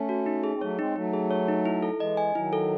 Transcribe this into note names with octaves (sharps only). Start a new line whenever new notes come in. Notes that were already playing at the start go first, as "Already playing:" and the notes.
Already playing: A3 C#4
F#4
D#4
G#4
C4
F#3 A3 C#5
G#3 C4 D#4
F#3 A3 D#4
G#4
C#5
D#4
E4
A4
E3 G#3 D#5
G#5
D#3 F#3 E4
A4